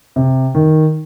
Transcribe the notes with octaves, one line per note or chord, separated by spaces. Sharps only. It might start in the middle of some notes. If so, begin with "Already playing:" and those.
C3
D#3